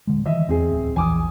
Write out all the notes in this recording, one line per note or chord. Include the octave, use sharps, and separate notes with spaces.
D#1 D3 G#3
D#3 E3 D#5 E5
E2 C4 G#4
D1
A#1 E2 E3 G#5 D6 D#6